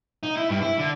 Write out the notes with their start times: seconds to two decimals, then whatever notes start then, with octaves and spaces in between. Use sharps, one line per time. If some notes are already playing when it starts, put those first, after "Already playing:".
0.23 D#4
0.37 E4
0.50 G2
0.61 E4
0.78 D3